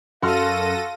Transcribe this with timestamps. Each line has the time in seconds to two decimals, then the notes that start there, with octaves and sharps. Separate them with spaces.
0.22 F#2 F#4 A4 F5 C6 F6 A#6 D#7